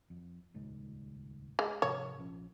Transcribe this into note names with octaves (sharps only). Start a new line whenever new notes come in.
F2
D#1 C#2 G#2
G#3
G#2 C3 F3 C#5
A#1 F3 C#4